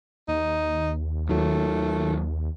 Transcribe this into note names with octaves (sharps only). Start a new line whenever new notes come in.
D#2 D#4
D#3 F#3 A3